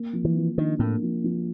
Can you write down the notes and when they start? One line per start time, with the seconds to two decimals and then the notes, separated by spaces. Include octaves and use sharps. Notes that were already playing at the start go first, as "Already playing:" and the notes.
Already playing: A#3
0.13 F3
0.25 E3
0.36 F3
0.58 D#3 D4
0.79 A2 A#3
1.02 F3
1.24 F3